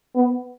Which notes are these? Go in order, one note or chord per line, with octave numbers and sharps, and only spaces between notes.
B3